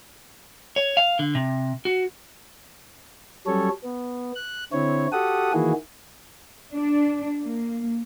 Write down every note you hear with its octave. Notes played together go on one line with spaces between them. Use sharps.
C#5
F5
D3
C3
F#4
F#3 G3 C#4 A4 C#5
B3
F#6
D3 C4 E4 C#5
F#4 G4 A4 F#5 D#6
D#3 E3 A#3 E4 F#4 G#4
D4
A#3